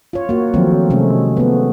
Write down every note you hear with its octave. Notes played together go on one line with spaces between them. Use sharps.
F4 C#5
A#3 F#4
D#3 F3 F#3 A3 C4
C3 G#3 A3 C#4
A3 B3